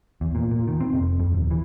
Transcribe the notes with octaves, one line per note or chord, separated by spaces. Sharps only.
E2
A#2
A#2
D#3
C4
F1
F2
D#1
E3